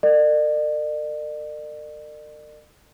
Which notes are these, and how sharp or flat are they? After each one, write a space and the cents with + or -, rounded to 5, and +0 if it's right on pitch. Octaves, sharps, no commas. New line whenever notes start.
A#4 -40 D5 +40